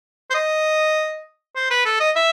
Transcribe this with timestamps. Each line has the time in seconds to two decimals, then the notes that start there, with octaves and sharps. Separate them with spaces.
0.30 C5
0.34 D#5
1.56 C5
1.70 B4
1.85 A4
2.00 D#5
2.16 E5